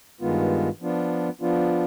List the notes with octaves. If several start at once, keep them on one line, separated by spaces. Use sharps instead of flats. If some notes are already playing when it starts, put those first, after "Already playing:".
G2 D#3 G#3 B3 F4
F3 B3 D4 F4
F3 B3 D4 F4